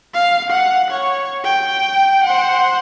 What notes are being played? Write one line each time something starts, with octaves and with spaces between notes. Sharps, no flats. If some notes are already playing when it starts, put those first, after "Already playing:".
F5
F#5
C#5
G5
C5 F#5